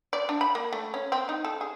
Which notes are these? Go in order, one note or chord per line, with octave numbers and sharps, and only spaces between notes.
D5
D4
B5
A#3
A3
C#4
C4
D#4
A4
G#4